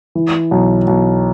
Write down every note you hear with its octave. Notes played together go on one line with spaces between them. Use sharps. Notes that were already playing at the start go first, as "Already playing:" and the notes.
E3
B1
B1